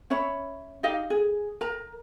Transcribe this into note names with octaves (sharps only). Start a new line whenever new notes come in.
C#4 C#5 E5 B5
D#4 G4 D#5 F5
G#4
A#4 A#5